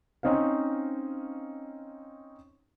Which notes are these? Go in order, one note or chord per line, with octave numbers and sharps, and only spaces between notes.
C4 C#4 D#4 C5 F5